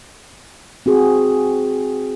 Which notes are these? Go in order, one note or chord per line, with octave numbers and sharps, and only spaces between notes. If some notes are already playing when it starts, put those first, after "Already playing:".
C4 F#4 G#4